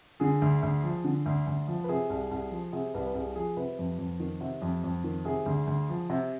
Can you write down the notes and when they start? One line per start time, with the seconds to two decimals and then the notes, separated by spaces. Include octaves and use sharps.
0.20 D3 G#4
0.42 D2
0.63 D2
0.84 F3
1.04 D3
1.26 D2
1.47 D2
1.68 F3
1.84 B4
1.89 C3 G#4
2.10 C2
2.31 C2
2.51 F3
2.72 C3 G#4
2.94 C2 B4
3.07 B4
3.15 C2 G#4
3.36 F3 G#4
3.57 C3 B4
3.79 F2
3.99 F2
4.20 D#3
4.41 C3
4.62 F2
4.84 F2
5.04 D#3
5.25 C3 G#4
5.46 D2
5.67 D2
5.89 F3
6.10 C3